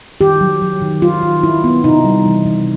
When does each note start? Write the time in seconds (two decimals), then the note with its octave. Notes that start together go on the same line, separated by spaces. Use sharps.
0.21 D#3 G4
0.41 F#3
0.62 F#3
0.82 D#3
1.02 F#3 F4
1.23 D#3
1.43 F#3 E4
1.64 B3
1.84 C3 D#4
2.05 G3
2.25 E3
2.46 C3